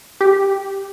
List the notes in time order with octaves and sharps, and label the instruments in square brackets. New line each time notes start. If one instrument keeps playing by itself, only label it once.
[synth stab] G4